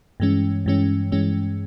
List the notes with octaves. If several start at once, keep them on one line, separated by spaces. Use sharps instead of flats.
G2 E3 G#3 C#4
G2 E3 G#3 C#4
G2 E3 G#3 C#4